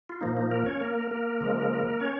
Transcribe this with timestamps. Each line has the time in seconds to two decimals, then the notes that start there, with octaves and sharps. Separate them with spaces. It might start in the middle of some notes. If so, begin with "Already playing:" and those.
0.09 F4
0.21 A#2 F3 A#3 D#4
0.37 D#4
0.51 A#3 A#4
0.66 C#4 C#5
0.80 A#3 A#4
1.11 A#3 A#4
1.41 C#3 F3 G#3
2.00 C#4 C#5